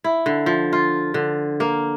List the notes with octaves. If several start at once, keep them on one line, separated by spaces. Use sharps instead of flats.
E4
D3
F3
F4
D3
A#3